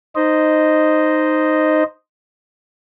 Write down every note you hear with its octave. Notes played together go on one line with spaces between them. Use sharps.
D#4 C5 D#5